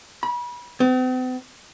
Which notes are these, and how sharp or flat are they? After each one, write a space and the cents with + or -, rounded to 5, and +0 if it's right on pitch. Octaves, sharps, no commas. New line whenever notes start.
B5 -30
C4 -45